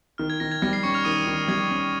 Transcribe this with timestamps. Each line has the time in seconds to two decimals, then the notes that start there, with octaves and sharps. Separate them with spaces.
0.18 D#3 F6
0.30 G#6
0.40 D#3 A#6
0.51 G#6
0.62 G3 A#6
0.73 C7
0.83 C#4 C#6 C#7
0.94 F6 F7
1.05 D#3 D#6 D#7
1.27 D#3
1.48 G3 G#6
1.70 C#4